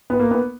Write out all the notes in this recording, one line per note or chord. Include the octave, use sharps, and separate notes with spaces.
B3
A#3
B3